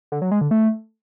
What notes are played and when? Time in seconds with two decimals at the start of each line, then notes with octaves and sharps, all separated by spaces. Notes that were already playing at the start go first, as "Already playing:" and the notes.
0.12 D3
0.22 F#3
0.31 G#3
0.41 D3
0.51 A3